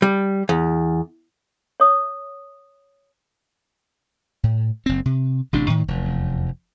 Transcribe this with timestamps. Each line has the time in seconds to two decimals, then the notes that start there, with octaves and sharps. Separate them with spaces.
0.02 G3
0.49 E2
1.80 C#5 D#6
4.43 A2
4.86 F#1 C4
5.05 C3
5.53 A1 C3 D4
5.68 A2 D#3
5.88 F1 E2